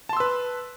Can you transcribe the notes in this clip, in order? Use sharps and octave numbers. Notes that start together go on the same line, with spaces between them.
B4 A5 C6 E6